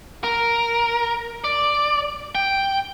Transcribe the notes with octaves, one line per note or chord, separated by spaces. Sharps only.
A#4
D5
G5